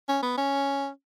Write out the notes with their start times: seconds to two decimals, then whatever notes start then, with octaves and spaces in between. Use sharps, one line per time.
0.08 C#4
0.23 B3
0.38 C#4